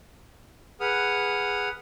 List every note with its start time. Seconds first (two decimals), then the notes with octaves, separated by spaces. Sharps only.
0.80 G#4 B4 F#5 D#6 F6